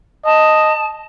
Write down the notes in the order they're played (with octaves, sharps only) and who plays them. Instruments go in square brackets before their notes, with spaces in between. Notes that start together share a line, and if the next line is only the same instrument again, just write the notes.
[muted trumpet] D#5 [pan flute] A5